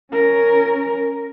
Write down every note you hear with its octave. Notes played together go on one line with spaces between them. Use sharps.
C#4 A#4